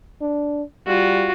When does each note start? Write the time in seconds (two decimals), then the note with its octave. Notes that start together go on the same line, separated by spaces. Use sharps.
0.21 D4
0.86 G3 F4 F#4